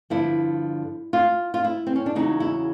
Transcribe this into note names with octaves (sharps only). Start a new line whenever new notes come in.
G2 D3 F3 E4
F4
F4
E4
C4
C#4
D4
E2 C#3 F#3 D#4
E4